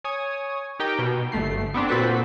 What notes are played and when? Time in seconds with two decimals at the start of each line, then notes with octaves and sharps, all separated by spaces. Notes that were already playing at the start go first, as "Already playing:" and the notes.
0.04 C#5 G#5 D#6
0.80 D#4 G4 A#4 G5
0.99 B2
1.32 G1 A3 C7
1.74 B3 C4 D4
1.88 A#2 C4 F#4 A4 B4 B6